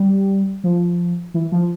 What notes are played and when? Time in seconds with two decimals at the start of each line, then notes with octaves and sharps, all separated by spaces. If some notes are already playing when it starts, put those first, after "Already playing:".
Already playing: G3
0.64 F3
1.34 E3
1.52 F3